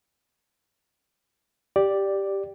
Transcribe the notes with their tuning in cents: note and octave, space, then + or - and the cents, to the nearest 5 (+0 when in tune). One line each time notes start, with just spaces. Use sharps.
G4 +0 D5 +0